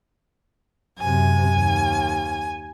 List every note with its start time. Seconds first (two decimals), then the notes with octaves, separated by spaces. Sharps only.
0.99 F#2 C3 G#5
1.56 D#2